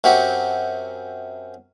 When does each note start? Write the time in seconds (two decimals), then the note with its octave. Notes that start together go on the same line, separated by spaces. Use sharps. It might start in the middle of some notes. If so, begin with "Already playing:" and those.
0.04 F#2 C4 F#4 G4